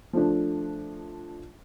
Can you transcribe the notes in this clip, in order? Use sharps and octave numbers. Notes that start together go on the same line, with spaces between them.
F3 A3 D4